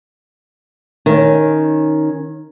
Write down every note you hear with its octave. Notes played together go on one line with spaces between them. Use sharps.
D#3 C#4